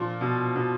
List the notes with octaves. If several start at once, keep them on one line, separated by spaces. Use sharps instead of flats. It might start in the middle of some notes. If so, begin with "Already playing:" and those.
Already playing: A#2 F3
B2
B2